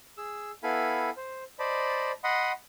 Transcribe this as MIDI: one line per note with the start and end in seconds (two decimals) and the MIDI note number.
0.18 0.51 68
0.18 0.51 88
0.63 1.10 59
0.63 1.10 64
0.63 1.10 69
0.63 1.10 77
0.63 1.10 80
0.63 1.10 83
1.17 1.44 72
1.59 2.12 72
1.59 2.12 74
1.59 2.12 75
1.59 2.12 81
1.59 2.12 83
2.24 2.52 75
2.24 2.52 78
2.24 2.52 83
2.24 2.52 84
2.24 2.52 87